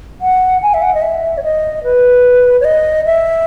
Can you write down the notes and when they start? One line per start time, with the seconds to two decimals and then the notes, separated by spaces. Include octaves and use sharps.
0.21 F#5
0.62 G#5
0.74 E5
0.82 F#5
0.94 D#5
1.02 E5
1.37 C#5
1.43 D#5
1.84 B4
2.60 C#5
2.64 D#5
3.06 E5